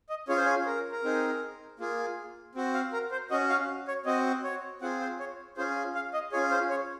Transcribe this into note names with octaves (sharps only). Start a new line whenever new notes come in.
D#5
C#4 F4 G#4 C#5
C5
C#5
A#4
A#4
C4 D#4 G#4
A#3 F4 G#4
C4 F#4
F5
A#4
C5
C#4 F#4 D#5
F5
C#5
C4 F#4 D#5
C#5
C4 F4 G#4 F#5
C5
C#5
C#4 F4 G#4 C5
F5
D#5
C#4 F4 G#4 C#5
C5
C#5